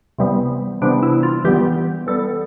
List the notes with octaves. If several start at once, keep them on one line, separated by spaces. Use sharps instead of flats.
C3 E3 G3 B3
C3 E3 G3 B3 D4
E4
F4
E3 G3 B3 G4
E3 G3 B3 A4